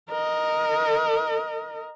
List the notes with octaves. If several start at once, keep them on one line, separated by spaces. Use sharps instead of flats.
A#4 D#5